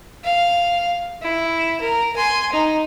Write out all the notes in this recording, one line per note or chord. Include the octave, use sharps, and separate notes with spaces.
F5
E4
A#4
G#5 C6
D#4